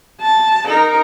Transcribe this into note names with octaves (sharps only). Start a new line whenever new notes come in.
A5
D#4 A#4